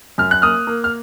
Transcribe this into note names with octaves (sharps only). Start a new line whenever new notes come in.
F#2 F6
F#6
A#3 D#6 F6
A#3
F6